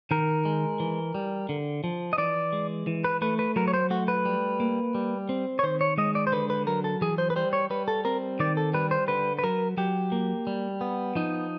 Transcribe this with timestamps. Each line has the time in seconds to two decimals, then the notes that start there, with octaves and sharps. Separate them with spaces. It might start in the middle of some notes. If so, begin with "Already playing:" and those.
0.11 D#3 A#4
0.45 G#3
0.80 E3
1.14 G3
1.49 D3
1.84 F3
2.13 D#5
2.18 E3 D5
2.53 G#3
2.87 E3
3.04 B4
3.22 A3 B4
3.39 B4
3.56 F#3 A#4
3.68 C#5
3.74 C5
3.90 A3 F#4
4.08 B4
4.25 G3
4.60 A#3
4.95 G3
5.29 C4
5.59 C#5
5.63 D#3 C5
5.81 C#5
5.98 G#3 D#5
6.15 D5
6.27 C5
6.32 D3 B4
6.50 B4
6.67 F#3 A#4
6.84 A4
7.01 E3 G#4
7.18 C5
7.30 B4
7.36 G3 C5
7.53 C#5
7.70 G3 B4
7.88 A4
8.05 C4 A#4
8.40 D#3 D5
8.57 A4
8.74 G3 B4
8.91 C5
9.08 D3 B4
9.39 B4
9.43 F#3 A#4
9.77 F#3 G4
10.12 A#3
10.47 G3
10.81 B3
11.15 F3 D#4